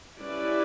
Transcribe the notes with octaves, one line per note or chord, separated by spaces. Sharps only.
G3 C#4 E4 B4 D5